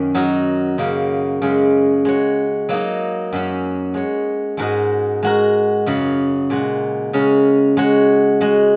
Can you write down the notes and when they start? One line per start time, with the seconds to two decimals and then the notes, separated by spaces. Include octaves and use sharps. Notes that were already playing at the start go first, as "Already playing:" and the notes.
Already playing: F#2 D#3 C#4
0.15 F#3 D#4 F#4 A#4
0.78 F#2 C#3 A#3
1.42 F#2 C#3 G#3
2.05 G#3 F#4 C#5
2.69 F#3 A#3 D#4
3.33 F#2 F#3 C#4
3.94 G#3 F#4 C#5
4.57 G#2 G#3 F#4 A#4 D#5
5.23 G#3 F#4 A#4
5.86 F#2 C#3 F#3
6.50 A#2 G#3 F#4
7.13 C#3 G#3 C#4 A#4
7.77 G#3 F#4 C#5
8.41 G#3 F#4 D#5